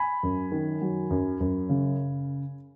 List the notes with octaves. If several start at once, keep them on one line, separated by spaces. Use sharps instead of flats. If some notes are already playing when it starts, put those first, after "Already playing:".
Already playing: G#5 B5
F#2
D#3
F#3
F#2
F#2
C#3